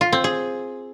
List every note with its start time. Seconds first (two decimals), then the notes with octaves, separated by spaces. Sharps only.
0.01 F4
0.13 C4
0.24 G#4